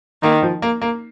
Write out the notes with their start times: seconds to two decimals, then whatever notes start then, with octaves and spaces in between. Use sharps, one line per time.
0.23 D#3 A#3
0.42 F3
0.62 A#3
0.81 A#3